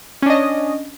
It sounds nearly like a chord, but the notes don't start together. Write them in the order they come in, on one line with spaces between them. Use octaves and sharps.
C#4 D4 D#5